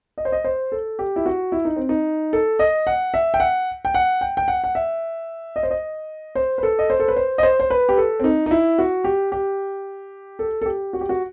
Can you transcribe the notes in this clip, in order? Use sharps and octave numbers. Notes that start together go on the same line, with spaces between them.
D#5
C5
D#5
C5
A4
G4
E4
F#4
E4
D#4
C4
D#4
A4
D#5
F#5
E5
G5
F#5
G5
F#5
G5
G5
F#5
F#5
E5
D#5
C5
D#5
C5
B4
A4
D#5
C5
A4
B4
C5
D#5
C5
C5
B4
G4
A4
C4
D#4
D#4
E4
F#4
G4
G4
A4
A4
G4
F#4
G4
F#4